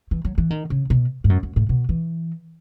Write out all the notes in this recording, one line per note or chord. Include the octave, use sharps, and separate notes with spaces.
E3
F#3
E3
D#3
C#3
B2
G#2
F#2
F#2
A2
B2
E3